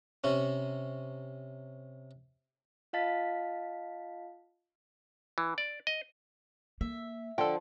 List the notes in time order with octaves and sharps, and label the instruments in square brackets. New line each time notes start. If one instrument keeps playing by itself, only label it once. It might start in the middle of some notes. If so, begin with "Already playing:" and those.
[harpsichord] C3 C#4
[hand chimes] F4 D#5 F5 A5 A6 B6
[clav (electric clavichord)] E3
D5
D#5
[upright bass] A#3 [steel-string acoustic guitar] E5
[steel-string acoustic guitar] D3 [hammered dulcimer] F3 [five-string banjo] A4 G5